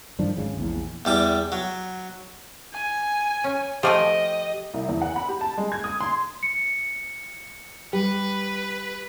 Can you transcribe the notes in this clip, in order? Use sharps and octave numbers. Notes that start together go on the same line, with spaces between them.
G2 D#3 F3 D4
G#1 C#2 C#3
A#1 E2
E2 G3 D6
F#3
G#5
C#4
F3 A3 G4 D#5 G#5
C2
E2
F#5
B5
G4
A5
G#3
G#6
D#6
C6
C#7
G3 G4 B4